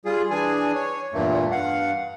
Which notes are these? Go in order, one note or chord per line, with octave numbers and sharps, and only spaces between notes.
G3 F4 G#4
E3 D4 G#4 G#5
C#5
E2 G2 A#2 A3 A#3
G2 F5 F#5